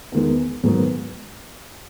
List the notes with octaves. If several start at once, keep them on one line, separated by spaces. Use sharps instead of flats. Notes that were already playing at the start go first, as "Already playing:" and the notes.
E2 D#3 G#3 B3
G#2 D#3 F#3 B3 F#4